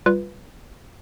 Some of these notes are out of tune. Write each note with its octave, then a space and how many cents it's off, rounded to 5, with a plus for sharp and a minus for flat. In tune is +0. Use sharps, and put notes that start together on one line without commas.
G3 +0 F4 +0 B4 +0